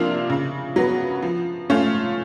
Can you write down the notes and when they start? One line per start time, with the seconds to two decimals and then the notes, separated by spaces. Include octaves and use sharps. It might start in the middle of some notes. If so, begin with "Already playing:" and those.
Already playing: C3 F3 A#3 D4 F4
0.30 C#3
0.76 F#3 B3
1.22 F3
1.70 A3 C#4 F4